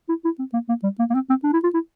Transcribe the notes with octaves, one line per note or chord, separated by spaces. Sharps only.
E4
E4
C4
A#3
A#3
G3
A#3
A#3
C4
C4
D4
E4
F4
E4